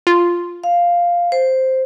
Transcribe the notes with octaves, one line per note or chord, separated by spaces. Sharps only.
F4
F5
C5